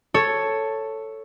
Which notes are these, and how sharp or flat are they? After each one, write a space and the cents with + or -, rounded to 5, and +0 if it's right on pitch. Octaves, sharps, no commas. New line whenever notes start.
A4 +5 C#5 +0